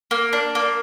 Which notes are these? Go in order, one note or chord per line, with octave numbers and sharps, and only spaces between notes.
A#3
D4
A#3